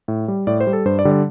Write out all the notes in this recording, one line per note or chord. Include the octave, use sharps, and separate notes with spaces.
A2
G3
A2 D5
C5
G3
A4
G2 C5
D5
D3 G3
D5